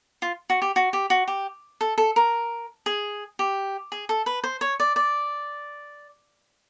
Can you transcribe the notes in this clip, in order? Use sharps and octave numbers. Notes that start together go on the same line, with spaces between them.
F4
F#4
G4
F#4
G4
F#4
G4
A4
A4
A#4
G#4
G4
G#4
A4
B4
C5
C#5
D5
D5